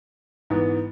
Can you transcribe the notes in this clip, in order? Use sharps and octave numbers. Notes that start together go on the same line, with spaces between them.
G#2 E3 B3